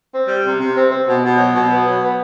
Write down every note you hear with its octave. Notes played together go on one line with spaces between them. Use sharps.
C4
G3
C3
C3
C4
C4
B2
B2
F#3
B2
B3
F#3
B3